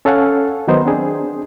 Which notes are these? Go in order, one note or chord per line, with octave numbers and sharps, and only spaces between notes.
C#4 A4 C#5 F5 F#5 G#5
D#3 F#3 B3 D#4 C5
C4 D4 G#4